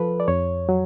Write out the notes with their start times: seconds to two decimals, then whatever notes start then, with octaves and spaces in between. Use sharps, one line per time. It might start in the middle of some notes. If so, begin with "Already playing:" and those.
Already playing: F3 A4 B4
0.20 D5
0.28 F2 C#5
0.69 F#3